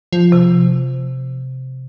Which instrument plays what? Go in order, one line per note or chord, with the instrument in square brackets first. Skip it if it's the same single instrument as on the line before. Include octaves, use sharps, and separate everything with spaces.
[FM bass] F3
[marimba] C3